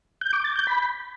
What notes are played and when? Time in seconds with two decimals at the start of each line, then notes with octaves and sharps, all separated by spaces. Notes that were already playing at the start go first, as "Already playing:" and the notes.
0.21 G6
0.33 D6
0.44 A6
0.56 G6
0.67 B5